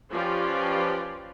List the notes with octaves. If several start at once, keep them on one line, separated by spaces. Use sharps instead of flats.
F3 C#4 F4 G4 B4 D5